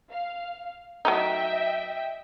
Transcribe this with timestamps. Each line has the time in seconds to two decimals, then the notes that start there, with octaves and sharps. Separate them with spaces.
0.10 F5
1.05 F#3 A3 D#4 D#5 E5 G5